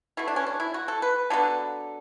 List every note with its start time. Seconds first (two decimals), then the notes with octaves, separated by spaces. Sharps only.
0.17 B2 A3 E4
0.28 D4
0.36 C#4
0.46 D4
0.60 E4
0.74 F#4
0.88 A4
1.02 B4
1.30 D3 F#3 B3 A4